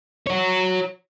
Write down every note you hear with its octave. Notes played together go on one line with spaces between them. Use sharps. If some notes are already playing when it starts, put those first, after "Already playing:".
F#4 C#5